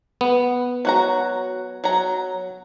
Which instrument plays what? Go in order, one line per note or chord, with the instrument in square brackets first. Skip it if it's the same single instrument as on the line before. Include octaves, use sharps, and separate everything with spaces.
[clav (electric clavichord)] B3
[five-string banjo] F#3 F#4 A#5
F#3 A#5